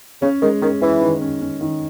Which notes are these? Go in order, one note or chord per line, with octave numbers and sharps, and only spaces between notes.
C#3 C#4
D#3 G#3
D#3 C#4
E3 C#4
D#3
C#4
C#4
D#3